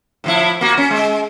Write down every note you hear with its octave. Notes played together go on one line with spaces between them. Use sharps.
A2 F3 E4
A#3 F#4
C#4
G#3